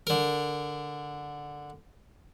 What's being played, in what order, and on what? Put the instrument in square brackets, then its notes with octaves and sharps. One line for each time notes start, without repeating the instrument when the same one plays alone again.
[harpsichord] D3 A#4